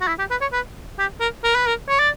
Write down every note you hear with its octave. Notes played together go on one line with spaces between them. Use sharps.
F#4
E4
G4
B4
C#5
B4
G4
A#4
A#4
B4
A#4
C#5
D5